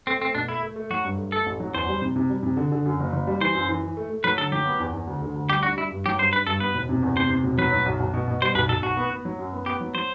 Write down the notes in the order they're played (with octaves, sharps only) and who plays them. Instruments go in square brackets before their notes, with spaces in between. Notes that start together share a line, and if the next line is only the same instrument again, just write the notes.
[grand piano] A3 [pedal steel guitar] C4
[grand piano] A3 [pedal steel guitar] C4
[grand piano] B2 [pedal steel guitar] D4
[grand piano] A3 [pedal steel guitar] E4
[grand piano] A3
A3
[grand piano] F#3 [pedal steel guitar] F#4
[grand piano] G2
A3
[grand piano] A3 [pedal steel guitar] A4
[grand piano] A1
F#3
[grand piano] E2 [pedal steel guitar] C5
[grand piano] G3
C3
C3
G3
C3
D3
D3
F#2
F#1
F#1
G3
[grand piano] E3 [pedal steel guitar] C5
[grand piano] F#2
E3
E3
A3
A3
[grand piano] F#3 [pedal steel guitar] B4
[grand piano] D3 [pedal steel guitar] A4
[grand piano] F#3 [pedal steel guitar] G4
[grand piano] B3
E2
E2
D2
D3
D2
[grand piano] G3 [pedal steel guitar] G4
[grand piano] D4 [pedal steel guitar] F#4
[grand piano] G3 [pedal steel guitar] E4
[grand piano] G2
[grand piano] F#3 [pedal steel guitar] G4
[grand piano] G2 [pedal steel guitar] C5
[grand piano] D4 [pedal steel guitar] B4
[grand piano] G2 [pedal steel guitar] A4
[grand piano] B3 [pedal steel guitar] B4
[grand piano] E1
C3
E2
[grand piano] C3 [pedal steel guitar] C5
[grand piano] C3
E1
[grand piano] F#3 [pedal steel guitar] B4
[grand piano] F#3
B1
B1
B2
B2
[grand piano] G3 [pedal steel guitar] C5
[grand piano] B1 [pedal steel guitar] B4
[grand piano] B1 [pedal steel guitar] A4
[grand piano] B1 [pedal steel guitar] F#4
[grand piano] B3
B3
F#3
F#2
B3
[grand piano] B3 [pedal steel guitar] G4
[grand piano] F#3
[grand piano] F#3 [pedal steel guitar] C5